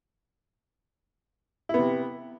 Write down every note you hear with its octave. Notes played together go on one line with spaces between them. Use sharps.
C3 B3 E4